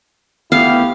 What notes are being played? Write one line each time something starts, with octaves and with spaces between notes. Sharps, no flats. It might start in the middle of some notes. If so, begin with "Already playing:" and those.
A3 B3 E4 G4 F5